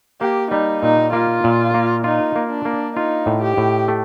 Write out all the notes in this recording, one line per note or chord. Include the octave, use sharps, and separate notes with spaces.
A#3 G4
G3 D#4
A#2 D#4
A#3 F4
A#2
A#3
D#4 F4
A#3
D4
A#3
D#4 F4
A2
G4
A2
A3